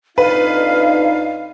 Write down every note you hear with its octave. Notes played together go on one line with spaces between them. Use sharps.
F2 D4 D#4 B4 F5